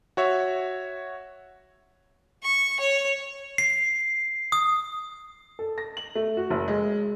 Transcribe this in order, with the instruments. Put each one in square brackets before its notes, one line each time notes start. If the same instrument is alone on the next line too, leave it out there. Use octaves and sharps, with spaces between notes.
[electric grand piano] F#4 C#5 E5
[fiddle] C#6
C#5
[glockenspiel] C7
D#6
[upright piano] A4
A#6
F#7
A3
F#4
F#1
G#3